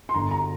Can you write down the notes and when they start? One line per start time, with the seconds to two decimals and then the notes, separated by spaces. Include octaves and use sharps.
0.09 C6
0.14 G1 A#5
0.31 A#5